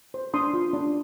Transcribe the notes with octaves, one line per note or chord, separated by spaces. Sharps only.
C5
D4 C6 D#6
F4
D4